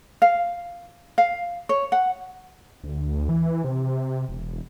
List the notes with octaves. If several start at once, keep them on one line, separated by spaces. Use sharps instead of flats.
F5
F5
C#5
F#5
D2
E3
C3
E1